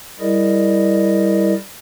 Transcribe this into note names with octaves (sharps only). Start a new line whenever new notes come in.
G3 E4 G#4 A#4 D5 D#5